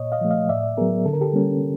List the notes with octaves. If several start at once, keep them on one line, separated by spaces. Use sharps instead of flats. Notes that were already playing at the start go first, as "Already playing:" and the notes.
Already playing: A#2 C#5 D#5
D#5 F5
F3 A3
D#5 F5
A2 D5 E5
F#3 B3 G#4 A#4
D3 A4
A#4
G4 A4
G3 A#3 C#4